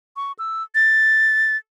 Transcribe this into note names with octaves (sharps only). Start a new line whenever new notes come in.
C#6
E6
A6